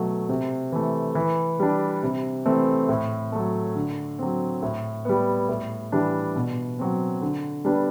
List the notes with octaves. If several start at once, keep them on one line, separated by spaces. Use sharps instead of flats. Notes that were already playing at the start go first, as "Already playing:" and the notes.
Already playing: B2 F#3 A3
C3
E3 A3
E3
G3 D4
C3
E3 A3 C4
A2
F#3 A3
D3
F#3 C4
A2
G3 B3
A2
E3 G3 D4
B2
F#3 C4
D3
G3 B3 D4